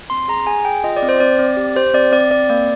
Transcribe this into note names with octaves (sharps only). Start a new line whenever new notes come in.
C4 C6
G#4 A#5
G#4 G#5
G#4 G5
F4 D#5
D5
C4
C5
C4 D5
C4 D5
G4
G4 C5
C4 D5
C4 D5
C4 D5
A#3 D5